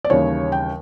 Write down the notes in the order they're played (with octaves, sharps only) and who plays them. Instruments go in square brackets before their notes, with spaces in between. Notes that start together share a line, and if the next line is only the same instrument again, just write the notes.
[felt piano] D5
D#2 C#3 E3 G3 C#5
G5